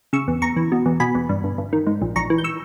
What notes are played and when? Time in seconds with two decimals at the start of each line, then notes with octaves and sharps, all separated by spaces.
0.13 C#3 C#6 E6
0.28 E2
0.42 E2 A#5 C#6
0.56 E3
0.72 B2
0.86 E2
1.00 B2 G#5 B5
1.15 E2
1.29 G2
1.44 G1
1.58 G1
1.73 D#3
1.87 G#2
2.02 A#1
2.16 A#1 A#5 C#6
2.30 E3
2.38 G6
2.44 C#6 E6